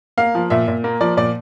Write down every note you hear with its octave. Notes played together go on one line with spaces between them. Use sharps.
A#3 F5
F3
A#2 E5
A#2
A#3
F3 D5
A#2 D5